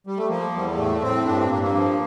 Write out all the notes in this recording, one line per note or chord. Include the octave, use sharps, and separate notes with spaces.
G3
A3
F3 A#3
E2 G3
A2 A3
A2 C4
G2 D4
C4
G2 A#3
A#3
F3